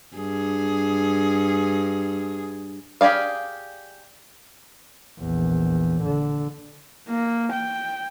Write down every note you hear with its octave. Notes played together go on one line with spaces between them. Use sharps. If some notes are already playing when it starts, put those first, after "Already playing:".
G2 G#4
G4 G#4 D5 F5
A#1 E2
D3
A#3
G5